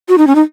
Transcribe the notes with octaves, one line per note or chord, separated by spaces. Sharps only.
F#4
D#4
C#4
D#4